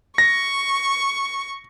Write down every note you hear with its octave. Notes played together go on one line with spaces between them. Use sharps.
C#6 A#6